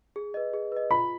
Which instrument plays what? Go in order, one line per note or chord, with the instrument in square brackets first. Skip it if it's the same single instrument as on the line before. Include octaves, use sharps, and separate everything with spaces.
[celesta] G#4
B4 D#5
G#4
B4 D#5
[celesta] F4 [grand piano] B5